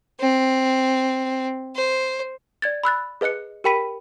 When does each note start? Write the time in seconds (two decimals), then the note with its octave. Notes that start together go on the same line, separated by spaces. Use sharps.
0.20 C4
1.76 C5
2.62 D5 G#6 A6
2.83 B5 E6 F#6 A6
3.21 G#4 B4 D#5 F#6 C#7
3.64 G4 A#4 G5 B5 B6 D#7